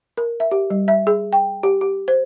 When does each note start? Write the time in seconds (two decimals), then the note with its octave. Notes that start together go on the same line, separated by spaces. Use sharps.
0.17 A#4
0.40 E5
0.51 G4
0.70 G3
0.88 E5
1.07 G#4
1.33 G5
1.63 G4
1.81 G4
2.08 C5